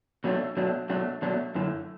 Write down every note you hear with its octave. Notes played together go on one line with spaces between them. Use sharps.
B2 F#3 A3 D4
B2 F#3 A3 D4
B2 F#3 A3 D4
B2 F#3 A3 D4
F#2 D3 A3 E4